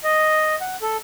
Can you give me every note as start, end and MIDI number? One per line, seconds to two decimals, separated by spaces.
0.04 0.55 75
0.61 0.76 78
0.82 0.97 69